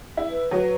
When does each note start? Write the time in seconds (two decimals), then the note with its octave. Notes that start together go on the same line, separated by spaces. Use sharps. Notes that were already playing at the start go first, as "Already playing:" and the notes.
0.17 E4
0.30 B4
0.51 F#3 B4